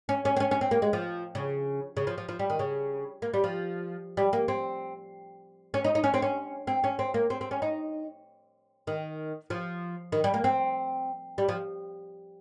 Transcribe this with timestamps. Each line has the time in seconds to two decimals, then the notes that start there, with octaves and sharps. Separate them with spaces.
0.09 C#4
0.25 C#4
0.36 C4
0.40 C#4
0.51 C#4
0.61 C4
0.71 A#3
0.82 G#3
0.93 F3
1.35 C#3
1.97 C#3
2.07 F3
2.18 F3
2.29 F3
2.39 G3
2.50 D#3
2.59 C#3
3.22 A#3
3.34 G3
3.44 F3
4.17 G3
4.33 A#3
4.48 C4
5.74 C#4
5.84 D#4
5.95 D#4
6.04 C#4
6.14 C4
6.22 C#4
6.67 C4
6.84 C#4
6.99 C4
7.14 A#3
7.30 C4
7.41 C4
7.51 C#4
7.62 D#4
8.87 D#3
9.50 F3
10.12 D#3
10.24 G3
10.34 A#3
10.44 C4
11.38 G3
11.49 F3